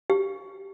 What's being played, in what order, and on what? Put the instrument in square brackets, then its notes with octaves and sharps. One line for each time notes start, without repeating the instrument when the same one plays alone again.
[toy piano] G4